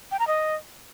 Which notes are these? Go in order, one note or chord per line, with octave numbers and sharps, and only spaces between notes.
G5
A#5
D#5